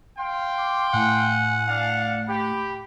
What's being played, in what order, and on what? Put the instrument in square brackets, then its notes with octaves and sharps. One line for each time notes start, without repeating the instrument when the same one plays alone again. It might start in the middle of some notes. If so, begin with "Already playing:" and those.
[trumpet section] F5 G5 C6
[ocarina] D6
[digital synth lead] A2 [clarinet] F#5 [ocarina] G#5
[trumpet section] D4 F5
[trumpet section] G4 [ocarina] B5